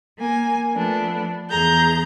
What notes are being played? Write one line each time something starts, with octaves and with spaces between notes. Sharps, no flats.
A#3 G#5
F3 A3 B3 D4
E2 G#4 A#5 G6